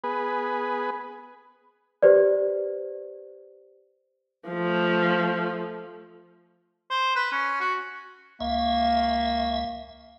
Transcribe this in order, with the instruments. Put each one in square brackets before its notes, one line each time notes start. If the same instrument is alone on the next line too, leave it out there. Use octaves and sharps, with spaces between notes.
[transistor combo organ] B3 G#4 B4
[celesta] G4 B4 C5 D5
[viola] F3 A3
[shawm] C5
B4
C#4
F#4
[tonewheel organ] C#2 E5 [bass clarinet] A#3